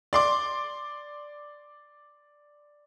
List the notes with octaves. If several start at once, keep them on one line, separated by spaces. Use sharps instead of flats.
D5 C6 D6